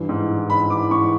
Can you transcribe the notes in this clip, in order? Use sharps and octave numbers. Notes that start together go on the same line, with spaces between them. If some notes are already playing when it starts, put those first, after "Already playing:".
Already playing: G2 E3
G#2
E3
G#2 B5
E3 D6
G#2 C#6